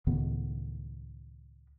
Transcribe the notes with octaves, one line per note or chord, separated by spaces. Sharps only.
C#2 A2 D#3 B3